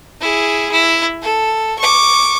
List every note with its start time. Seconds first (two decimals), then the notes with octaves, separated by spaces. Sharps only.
0.20 E4 G#4
0.71 E4
1.22 A4
1.78 C#6 D6